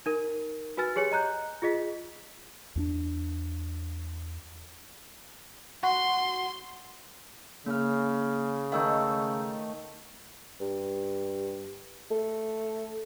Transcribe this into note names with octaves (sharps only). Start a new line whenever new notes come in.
D#4 A#4
F#4 B4 G#5 F6 A6
G4 G#4 C#5 G#5 C#7
D#5 A#5 F#6 G6
F4 G#4 D#5 B6
E2 C#4 D4
F#4 C6
C#3 A#3 F6
D#3 A3 D#4 F5 E6
G2
A3